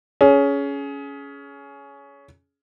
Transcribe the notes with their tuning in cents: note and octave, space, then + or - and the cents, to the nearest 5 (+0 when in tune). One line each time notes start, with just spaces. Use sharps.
C#4 +15 G#4 +20